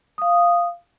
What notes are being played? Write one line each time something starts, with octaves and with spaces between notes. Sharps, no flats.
F5 D#6